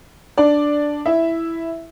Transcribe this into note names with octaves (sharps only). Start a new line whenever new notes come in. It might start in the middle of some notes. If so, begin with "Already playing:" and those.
D4 D5
E4 E5